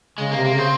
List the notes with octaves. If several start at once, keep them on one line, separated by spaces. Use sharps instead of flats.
C#3 G#3
A#3
C3
A#3
C#3 C4